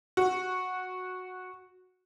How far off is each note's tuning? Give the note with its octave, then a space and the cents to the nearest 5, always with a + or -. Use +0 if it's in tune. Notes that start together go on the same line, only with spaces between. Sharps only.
F#4 -10